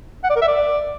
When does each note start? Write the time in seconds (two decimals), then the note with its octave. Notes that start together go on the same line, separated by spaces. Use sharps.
0.24 F#5
0.30 D5
0.36 A#4
0.42 E5
0.48 D5